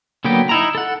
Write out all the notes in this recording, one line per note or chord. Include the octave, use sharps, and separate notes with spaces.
D3 F#3 A#3 B3 G5
D#4 E4 A#5
A4 F#5